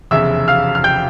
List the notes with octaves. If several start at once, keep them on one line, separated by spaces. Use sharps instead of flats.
F1 E2 C#3 E5 E6
F5 F6
F6
G5 G6